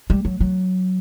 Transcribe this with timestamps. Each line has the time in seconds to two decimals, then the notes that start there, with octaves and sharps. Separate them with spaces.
0.10 G3
0.25 F#3
0.40 F#3